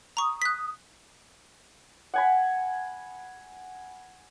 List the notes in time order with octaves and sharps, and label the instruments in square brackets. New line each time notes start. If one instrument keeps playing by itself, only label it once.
[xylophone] A#5 C#6 [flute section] D#6
[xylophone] F#6 B6
[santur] F#5 G#5 B5